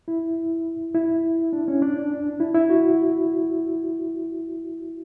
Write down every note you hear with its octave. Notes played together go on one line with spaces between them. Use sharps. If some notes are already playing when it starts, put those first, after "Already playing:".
E4
E4
D4
C#4
D4
E4
E4
F#4